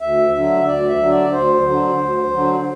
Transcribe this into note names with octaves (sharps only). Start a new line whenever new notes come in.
D2 E5
D3 F#3 E5
D2 D5
E5
D3 F#3
D5
D2 C5
D3 F#3
D2
D3 F#3